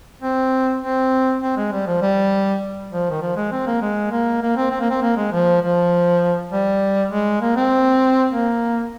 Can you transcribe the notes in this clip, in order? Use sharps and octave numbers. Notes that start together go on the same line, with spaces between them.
C4
C4
C4
G#3
G3
F3
G3
F3
D#3
F3
G#3
C4
A#3
G#3
A#3
A#3
C4
C4
A#3
C4
A#3
G#3
F3
F3
G3
G#3
A#3
C4
A#3